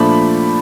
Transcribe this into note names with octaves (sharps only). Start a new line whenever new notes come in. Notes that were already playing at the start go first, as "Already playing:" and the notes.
Already playing: A#2 F3 A3 D4 A5 B5